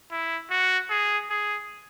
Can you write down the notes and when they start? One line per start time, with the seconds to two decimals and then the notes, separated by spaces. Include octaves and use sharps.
0.11 E4
0.51 F#4
0.90 G#4
1.30 G#4